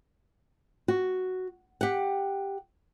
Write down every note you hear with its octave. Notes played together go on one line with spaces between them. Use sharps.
F#4
G4 F#5